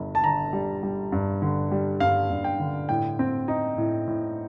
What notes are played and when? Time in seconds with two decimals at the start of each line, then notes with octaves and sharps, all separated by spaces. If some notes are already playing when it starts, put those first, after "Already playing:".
Already playing: G1 G2
0.15 A5
0.23 D3 A#5
0.53 G3
0.83 G3
1.12 G2
1.42 D3
1.72 G3
2.00 G2 F5
2.30 G2
2.44 G5
2.60 D3
2.89 A2 G5
3.19 C4
3.48 D#4
3.78 A2
4.08 A2